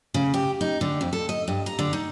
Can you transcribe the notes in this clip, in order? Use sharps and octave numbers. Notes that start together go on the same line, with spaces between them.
C#3
G4
D#4
D3
F2
A4
D#5
G2
A#5
D3
D#4